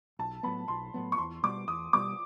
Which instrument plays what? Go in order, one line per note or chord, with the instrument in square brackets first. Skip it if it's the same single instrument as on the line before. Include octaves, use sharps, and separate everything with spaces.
[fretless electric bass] B1 [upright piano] A5
[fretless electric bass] A2 F#3 B3 [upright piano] B5
[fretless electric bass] B1 [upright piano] C6
[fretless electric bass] A2 F#3 B3
[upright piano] C#6
[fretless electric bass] E2 [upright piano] C6
[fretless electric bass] B2 G3 B3 [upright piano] D6
[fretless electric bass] E2 [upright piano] D#6
[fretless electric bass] B2 G3 B3 [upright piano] D6